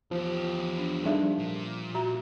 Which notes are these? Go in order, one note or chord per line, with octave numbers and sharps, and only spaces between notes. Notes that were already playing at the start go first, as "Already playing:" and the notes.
E2 F3 G4
D4
G3 D4 D#4 F4 G#4 E5
A#2
F#4 E5 A#5